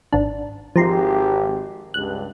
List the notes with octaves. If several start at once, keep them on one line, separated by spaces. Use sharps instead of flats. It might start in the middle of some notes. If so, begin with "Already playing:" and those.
G#1 D4
G#1 F3 G4 A#5 C6
C#2 G2 F#6